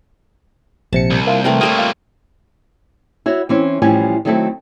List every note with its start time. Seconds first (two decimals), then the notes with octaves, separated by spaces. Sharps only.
0.93 A#1 C3 A5 C#7
1.10 C2
1.27 A#3 E4 F4
1.44 E3 A3 C4 A#4
1.61 G3 A#3 C4 A4 C#5 D#6
1.79 F4
3.26 E4 F#4 C#5
3.49 E3 C4 C#4
3.82 A2 E3 F3 G3 C#4 G#5
4.25 D#3 F#3 A3 C4 E4 A4